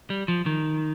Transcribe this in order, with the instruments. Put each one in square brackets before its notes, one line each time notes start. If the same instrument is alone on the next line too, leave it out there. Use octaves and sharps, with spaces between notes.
[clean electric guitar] G3
F3
D#3